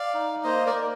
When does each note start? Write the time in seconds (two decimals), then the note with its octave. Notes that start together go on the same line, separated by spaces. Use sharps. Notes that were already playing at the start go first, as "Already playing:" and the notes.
Already playing: D5 F5
0.14 D#4
0.43 A#3 C5 D#5
0.67 A#4 D5
0.75 A#3